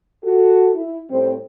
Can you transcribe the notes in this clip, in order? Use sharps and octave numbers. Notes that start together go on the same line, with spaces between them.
F#4 A4
E4
A2 G3 C4